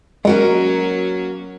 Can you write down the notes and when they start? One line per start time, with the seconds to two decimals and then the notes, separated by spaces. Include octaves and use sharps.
0.25 F#3 G#3 A#3 C#4 F#4 A#4